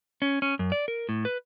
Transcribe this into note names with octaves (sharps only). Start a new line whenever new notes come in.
C#4
C#4
F#2
D5
A#4
A2
B4